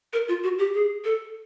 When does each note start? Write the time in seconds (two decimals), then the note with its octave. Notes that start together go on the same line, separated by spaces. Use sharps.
0.13 A#4
0.28 F4
0.44 F#4
0.59 G4
0.74 G#4
1.05 A4